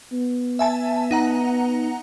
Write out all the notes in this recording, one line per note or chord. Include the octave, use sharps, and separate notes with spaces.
B3
E5 G#5 A5
D#4 F#5 A#5